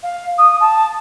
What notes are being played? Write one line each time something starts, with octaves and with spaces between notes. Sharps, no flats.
F5
D#6
A5